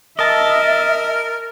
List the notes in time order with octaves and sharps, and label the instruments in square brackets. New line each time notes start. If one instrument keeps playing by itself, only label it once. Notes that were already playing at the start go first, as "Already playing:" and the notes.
[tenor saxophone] A#4 [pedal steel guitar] D#5 A5 [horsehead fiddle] E5